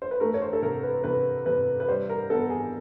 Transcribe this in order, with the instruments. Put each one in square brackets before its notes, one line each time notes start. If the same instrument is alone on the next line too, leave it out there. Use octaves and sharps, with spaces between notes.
[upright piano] C5
B4
A3 A#4
C#5
C5
A4
C3 A#4
B4
C3 B4
C3 B4
B4
G3 C5
A#4
B3 A4
G#4